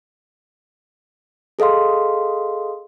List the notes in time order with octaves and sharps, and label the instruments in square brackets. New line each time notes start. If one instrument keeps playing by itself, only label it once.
[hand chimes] G#4 A4 D#5 F5 C6